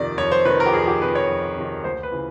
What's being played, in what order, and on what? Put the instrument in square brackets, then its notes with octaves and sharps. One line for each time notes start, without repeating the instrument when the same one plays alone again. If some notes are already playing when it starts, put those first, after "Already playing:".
Already playing: [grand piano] F2 C3 D#3 D5
F2 C#5
C5
C3 D#3 B4
A#4
G4
F2 G#4
G4
C3 D#3 B4
C#5
F2
C3 D#3
D2 C5
B4
C#3 E3